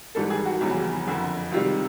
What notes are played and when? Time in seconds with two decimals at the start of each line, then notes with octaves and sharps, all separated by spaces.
0.15 G#1 G#2 E3 G3 A4
0.30 G#4
0.46 F#4
0.61 F1 E2 C#3 E3 G3
1.06 F#1 F2 D3
1.51 C#2 C3 D#3 G3 F4